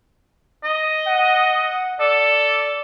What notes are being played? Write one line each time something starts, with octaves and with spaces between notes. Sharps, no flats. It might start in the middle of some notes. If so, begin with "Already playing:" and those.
D#5
F#5
A4 D5